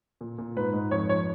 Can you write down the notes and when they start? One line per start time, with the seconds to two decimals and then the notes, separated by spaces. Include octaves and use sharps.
0.21 A#2
0.38 A#2
0.57 G#2 B4
0.73 G#2
0.91 F2 C#5
1.09 F2 C#5